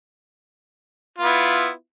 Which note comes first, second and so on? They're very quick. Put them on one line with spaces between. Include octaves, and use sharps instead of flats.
F4 B3 E4